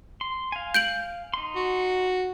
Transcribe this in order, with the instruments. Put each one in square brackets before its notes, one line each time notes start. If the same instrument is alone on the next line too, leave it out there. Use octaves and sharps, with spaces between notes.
[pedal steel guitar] C6
F5 G#5
[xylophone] G6 D7 F#7
[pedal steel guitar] D#4 C6
[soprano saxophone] F#4